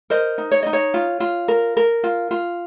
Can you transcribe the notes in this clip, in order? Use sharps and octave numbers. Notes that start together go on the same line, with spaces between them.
A#4 C5 D#5
D#4
C#5
D#4 D#5
C#5
F4
F4
A#4
A#4
F4
F4